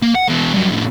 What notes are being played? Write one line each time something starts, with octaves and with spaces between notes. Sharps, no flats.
A#3
F#5
B2 E3
G2 F#3
F2 A2